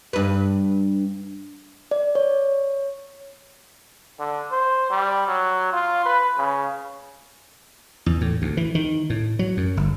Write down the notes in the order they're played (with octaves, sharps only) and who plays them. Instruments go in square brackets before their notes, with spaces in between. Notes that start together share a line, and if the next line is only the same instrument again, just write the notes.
[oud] G2 B4
[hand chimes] D5
C#5
[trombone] D3
C5
G3
F#3
F4
B4
C#3
[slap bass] E2
A2
D2
E3
D#3
A2
F#3
F#2
G1